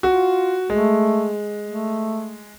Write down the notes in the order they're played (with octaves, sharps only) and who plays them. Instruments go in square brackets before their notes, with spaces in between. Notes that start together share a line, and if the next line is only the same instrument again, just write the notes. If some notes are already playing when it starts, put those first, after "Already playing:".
[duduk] F4 [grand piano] F#4
[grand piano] G#3 [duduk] A3
[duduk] A3